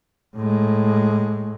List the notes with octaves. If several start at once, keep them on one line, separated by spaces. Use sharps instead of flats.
A2 G#3